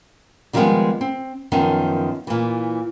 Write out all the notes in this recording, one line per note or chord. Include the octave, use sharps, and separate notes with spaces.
D3 D#3 F3 G3 G#3 B3
C4
F#2 D#3 F3 B3
A#2 E3